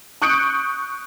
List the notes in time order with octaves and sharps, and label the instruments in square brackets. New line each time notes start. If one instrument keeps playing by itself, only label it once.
[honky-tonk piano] C#6 D#6 F#6 G6 C#7 D7